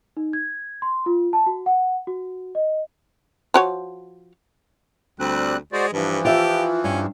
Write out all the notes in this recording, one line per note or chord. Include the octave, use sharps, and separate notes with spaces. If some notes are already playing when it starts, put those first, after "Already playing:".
D#4
G#6
C6
F4
A5
F#4
F#5
F#4
D#5
F3 F#4 C#5
D2 G3 C4 F#6
G#3 F#4 C5 D5
G2 E3 F3
F4 G4 E5
G2 C#4